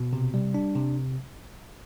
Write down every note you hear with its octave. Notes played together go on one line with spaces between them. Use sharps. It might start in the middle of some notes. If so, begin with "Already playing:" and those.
Already playing: B2
C3
G3
D4
C3